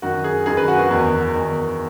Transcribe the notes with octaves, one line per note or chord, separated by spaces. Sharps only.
F#2 D#3 F#4
G#4
F#2 D#3 G#4
B4
F#4
F#4
E2 D#3
E2 D#3